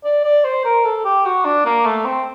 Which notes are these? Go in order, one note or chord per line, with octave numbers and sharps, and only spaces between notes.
D5
D5
C5
A#4
A4
G4
F#4
D4
A#3
A3
C4